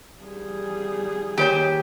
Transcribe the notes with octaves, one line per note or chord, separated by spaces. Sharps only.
G3 G#4
D#3 A#3 G4 C5 C#5 G5 G#5